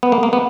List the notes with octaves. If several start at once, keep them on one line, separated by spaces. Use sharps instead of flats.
B3
A#3
A#3
B3